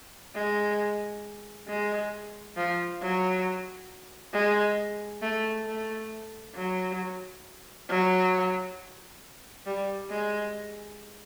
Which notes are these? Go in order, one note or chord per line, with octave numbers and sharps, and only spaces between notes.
G#3
G#3
F3
F#3
G#3
A3
A3
F#3
F#3
G3
G#3